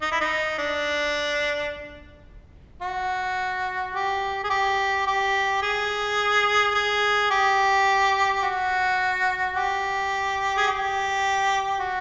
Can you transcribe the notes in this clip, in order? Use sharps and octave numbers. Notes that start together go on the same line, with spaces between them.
D#4
E4
D#4
D4
F#4
G4
G#4
G4
G4
G#4
G#4
G4
F#4
G4
G#4
G4
F#4